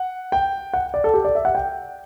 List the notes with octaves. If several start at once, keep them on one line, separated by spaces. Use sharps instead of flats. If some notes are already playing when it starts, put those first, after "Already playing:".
Already playing: F#5
G5
F#5
D5
A4
G4
D5
E5
F#5
G5